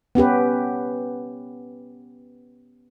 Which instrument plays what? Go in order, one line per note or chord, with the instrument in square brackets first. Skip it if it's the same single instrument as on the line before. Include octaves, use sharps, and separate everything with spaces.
[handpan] B3 C#4 G4 B4